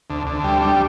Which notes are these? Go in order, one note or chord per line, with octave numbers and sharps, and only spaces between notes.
D2
D2
G3
G3